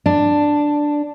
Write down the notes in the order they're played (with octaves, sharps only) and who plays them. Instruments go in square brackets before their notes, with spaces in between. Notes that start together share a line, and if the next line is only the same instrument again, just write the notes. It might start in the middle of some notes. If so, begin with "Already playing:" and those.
[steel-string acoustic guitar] D4